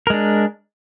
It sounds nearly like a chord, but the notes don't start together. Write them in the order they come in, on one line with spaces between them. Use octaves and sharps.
A#4 G#3 D4